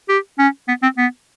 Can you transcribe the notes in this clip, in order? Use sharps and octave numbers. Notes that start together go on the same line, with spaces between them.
G4
C#4
B3
C4
B3